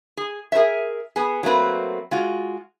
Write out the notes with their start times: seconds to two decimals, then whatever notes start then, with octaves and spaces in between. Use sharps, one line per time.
0.17 G#4
0.52 G#4 A#4 C5 C#5 E5
1.16 B3 G#4
1.43 F#3 A3 A#3 C4 B4
2.11 G#3 F4 F#4